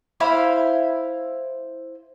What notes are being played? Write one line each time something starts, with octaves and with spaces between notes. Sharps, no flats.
E4 C5 F5 B5